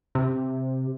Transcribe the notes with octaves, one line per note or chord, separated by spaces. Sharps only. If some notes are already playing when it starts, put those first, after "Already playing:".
C3